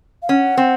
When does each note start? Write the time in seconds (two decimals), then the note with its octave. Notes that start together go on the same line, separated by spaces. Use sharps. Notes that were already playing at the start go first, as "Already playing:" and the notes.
0.23 F5
0.29 C#4 F#5
0.57 C4